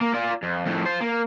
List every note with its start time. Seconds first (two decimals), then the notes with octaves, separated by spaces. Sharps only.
0.01 A#3
0.14 F4 D5
0.43 F2
0.66 F2 A2
0.85 F4 C5
1.01 A#3